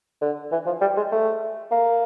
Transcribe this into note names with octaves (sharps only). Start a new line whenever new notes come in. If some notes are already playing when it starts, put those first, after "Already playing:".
D3
E3
F3
G3
G#3
A3
A#3